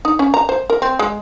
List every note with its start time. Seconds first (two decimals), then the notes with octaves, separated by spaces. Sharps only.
0.05 D#4
0.19 C#4
0.34 A#5
0.49 C5
0.70 A#4
0.82 C4
0.99 G#3